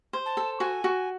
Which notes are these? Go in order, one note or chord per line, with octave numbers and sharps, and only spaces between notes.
C5
A5
A4
F#4 G#5
F#4